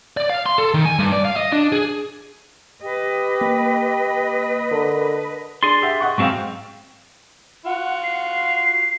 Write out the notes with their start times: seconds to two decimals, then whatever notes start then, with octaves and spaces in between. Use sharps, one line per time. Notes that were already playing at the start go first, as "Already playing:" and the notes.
0.17 D5
0.30 F5
0.46 C6
0.58 A4
0.74 D#3
0.85 G#5
0.99 G2
1.12 D5
1.25 F5
1.36 D#5
1.52 D4
1.72 G#4
2.83 G4 B4 D#5
3.41 A#3
4.71 D3 A#4 B5
5.63 D4 G#4 C6 A6
5.82 G4 E5 F#5
6.00 D#5 F#5 C#6
6.18 G#2 F#3 G#3 C4 F5 G5 C#6
7.66 F4 F#4 F#5
8.03 C7